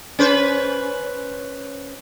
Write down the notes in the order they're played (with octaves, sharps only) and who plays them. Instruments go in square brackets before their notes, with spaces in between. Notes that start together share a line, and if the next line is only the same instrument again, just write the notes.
[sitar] C#4 B4 C5